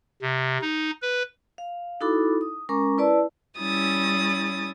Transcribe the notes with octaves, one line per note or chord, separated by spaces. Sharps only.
C3
D#4
B4
F5
D#4 E4 F#4 A4 B5 D6
D#6
G#3 C#4 A#4 A#5 C#6 D6
E4 B4 D5 A5 E6
G3 C#4 E4 D#6 A6